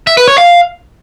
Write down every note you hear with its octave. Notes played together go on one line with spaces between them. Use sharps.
E5
B4
C#5
F5